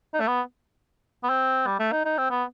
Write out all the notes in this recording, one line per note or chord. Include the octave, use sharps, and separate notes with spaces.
D#4
A3
B3
B3
C4
G3
A3
D#4
D#4
C4
B3